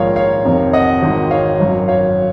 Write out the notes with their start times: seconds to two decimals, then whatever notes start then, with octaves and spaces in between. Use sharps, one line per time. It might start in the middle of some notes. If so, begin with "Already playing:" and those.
Already playing: A#1 G#2 D#3 C#5 F5
0.16 C#5 F5
0.45 F1 F2 C3 D#3
0.73 D#5 F#5
1.02 G#1 G#2 D#3
1.31 C#5 F5
1.60 G#1 F#2 D#3
1.88 C#5 F5